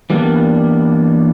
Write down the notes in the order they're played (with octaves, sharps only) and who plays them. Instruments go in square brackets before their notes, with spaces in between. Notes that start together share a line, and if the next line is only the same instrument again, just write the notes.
[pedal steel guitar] E3 G3 A#3 B3 D4